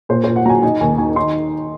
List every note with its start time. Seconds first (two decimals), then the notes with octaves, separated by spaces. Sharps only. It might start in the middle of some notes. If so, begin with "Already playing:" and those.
0.09 A#2 C5
0.24 A#2 C5
0.36 F#5
0.46 F#3 G#5 A#5
0.62 D#4 G#5
0.81 D#2 G#5
0.98 D#3 G#5
1.16 D#4 C6